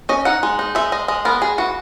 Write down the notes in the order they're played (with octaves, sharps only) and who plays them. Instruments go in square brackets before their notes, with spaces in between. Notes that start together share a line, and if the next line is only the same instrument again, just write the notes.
[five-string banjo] C#4 D#5
D#4 F#5
G#3
D#4
G#3 E5
G#3 D#5
G#3 D#5
B3 A#4
G#3 G#4
E3 F#4